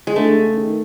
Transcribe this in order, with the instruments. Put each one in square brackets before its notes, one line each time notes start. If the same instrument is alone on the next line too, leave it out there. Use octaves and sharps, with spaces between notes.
[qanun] G#3
[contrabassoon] D3 [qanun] A3
[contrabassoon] C#3
D#3